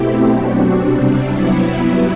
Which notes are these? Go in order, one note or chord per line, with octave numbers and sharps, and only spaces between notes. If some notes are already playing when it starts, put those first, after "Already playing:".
Already playing: B2 A3 C4 E4 G4
B2 F#3 C4 D4 F#4
C3 G3 C4 D4
C3 F#3 B3 E4
G2 F#3 B3